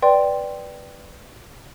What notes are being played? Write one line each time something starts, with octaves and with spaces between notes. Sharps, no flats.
B4 D5 G5 C6